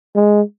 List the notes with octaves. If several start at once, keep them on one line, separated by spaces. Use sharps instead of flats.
G#3